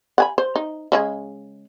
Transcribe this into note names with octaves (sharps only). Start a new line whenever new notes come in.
F#5 G#5 B5
C5
D#4
C#3 G#3 G#4